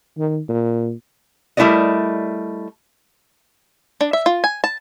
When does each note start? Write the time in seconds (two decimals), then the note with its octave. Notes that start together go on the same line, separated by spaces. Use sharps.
0.18 D#3
0.49 A#2
1.57 G3 A3 E4 A#4 D5 D#5
4.01 D4
4.13 E5
4.26 F4
4.44 G#5
4.64 A5